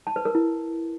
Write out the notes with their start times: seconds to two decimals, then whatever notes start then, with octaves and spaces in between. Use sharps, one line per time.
0.07 A5
0.16 B4
0.25 A#4
0.35 E4